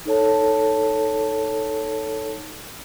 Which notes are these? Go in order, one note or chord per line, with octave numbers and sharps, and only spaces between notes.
D#4 A4 C#5 A5